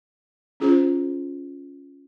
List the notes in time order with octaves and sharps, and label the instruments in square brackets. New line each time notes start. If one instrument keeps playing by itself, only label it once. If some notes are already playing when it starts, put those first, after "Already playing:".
[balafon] C#4 F4 G#4 C5